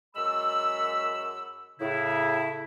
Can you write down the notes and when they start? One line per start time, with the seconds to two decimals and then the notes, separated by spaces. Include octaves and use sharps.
0.15 F#2 G#3 B5 E6
1.80 A2 C#3 E4